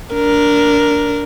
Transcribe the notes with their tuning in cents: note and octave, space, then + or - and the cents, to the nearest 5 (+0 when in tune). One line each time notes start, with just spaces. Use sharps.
D4 -15 A#4 +0